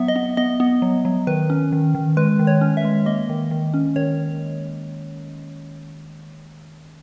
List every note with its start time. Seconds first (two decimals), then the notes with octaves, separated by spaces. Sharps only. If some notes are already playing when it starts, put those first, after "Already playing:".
Already playing: F#3 B3 E5
0.08 D#5
0.16 B3
0.37 B3 D#5
0.60 B3
0.82 F#3
1.05 F#3
1.27 D#3 B4
1.50 C#4
1.72 D#3
1.95 D#3
2.17 G#3 B4
2.39 D#3
2.47 C#5
2.61 C#4
2.77 E5
2.85 G#3
3.06 A#3 D#5
3.29 D#3
3.51 D#3
3.74 C#4
3.96 D#3 C#5